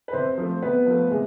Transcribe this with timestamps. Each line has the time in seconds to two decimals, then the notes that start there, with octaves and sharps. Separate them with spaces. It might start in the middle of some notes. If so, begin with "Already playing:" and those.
0.08 B4
0.13 C3 C4 C5
0.38 F3 A3
0.62 C3 B3 B4
0.87 F3 A3
1.11 C3 G#3